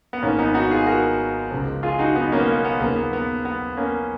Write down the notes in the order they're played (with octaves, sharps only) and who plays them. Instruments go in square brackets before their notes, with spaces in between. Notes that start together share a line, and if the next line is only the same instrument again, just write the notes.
[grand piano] B3
G#1 G#2 F3 A#3 C#4
B3 D#4
D#4 F#4
F4 G#4
F#4 A#4
C#2 C#3 F3
F4 G#4
D#4 F#4
B3 D#4
A#3 C#4
B3
A#3
B3
D#2 C#3 F3 A#3
B3
B3
B3
A#3 C#4